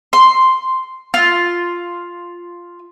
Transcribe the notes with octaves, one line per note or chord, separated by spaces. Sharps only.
C6
F4